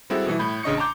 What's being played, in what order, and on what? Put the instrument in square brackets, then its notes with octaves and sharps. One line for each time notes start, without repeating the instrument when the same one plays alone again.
[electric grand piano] G3 G#3 C4 E4 F#4 A4
B2 E3 G3 E4
A2 B5 G6
A1 C#3 D4 D#5 C#6 C#7
A5 A#5 C6 D6 G6